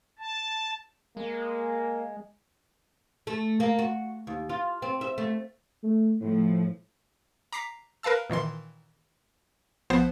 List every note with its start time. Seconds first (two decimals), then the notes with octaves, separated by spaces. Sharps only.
0.19 A5
1.17 G#3 A#3
3.27 A3
3.60 A#3
3.79 F#4
4.27 D#2
4.49 F4
4.82 C4
5.01 E5
5.18 A3
5.83 A3
6.21 A2 F3 A3
7.52 A#5 D6 B6 C7
8.03 A#4 B4 F5 A5 E6
8.30 A#2 D#3 E3 C6
9.90 A#1 F3 B3 C5